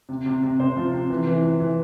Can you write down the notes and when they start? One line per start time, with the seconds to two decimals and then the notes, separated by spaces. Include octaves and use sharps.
0.09 C3
0.26 C3
0.43 C3
0.60 C3 C5
0.76 F3
0.93 C3
1.10 E3
1.27 E3
1.43 E3
1.60 E3